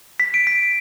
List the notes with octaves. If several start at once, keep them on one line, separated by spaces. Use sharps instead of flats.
B6
D7
B6